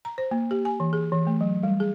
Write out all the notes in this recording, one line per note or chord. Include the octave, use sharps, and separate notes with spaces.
A#5
C5
A#3
G4
G#5
E3
G#4
E3
A3
F#3
G3
G#4